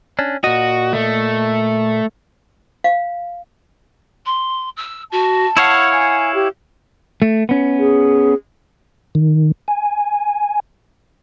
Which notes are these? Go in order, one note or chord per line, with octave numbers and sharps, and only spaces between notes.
C#4 D4
A#2 F#4 D#5
A3
F5
C6
E6
F#4 A5
E4 C#5 F5 F#5
G#5
G4
A3
B3 C#4
G#4
D#3
G#5